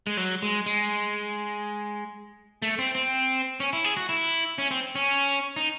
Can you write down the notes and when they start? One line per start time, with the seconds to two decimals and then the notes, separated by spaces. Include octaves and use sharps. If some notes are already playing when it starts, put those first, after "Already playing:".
0.07 G#3
0.17 F#3
0.42 G#3
0.66 G#3
2.62 A3
2.79 C4
2.95 C4
3.60 C#4
3.73 E4
3.84 G#4
3.97 F#4
4.09 E4
4.58 C#4
4.71 C4
4.95 C#4
5.56 D#4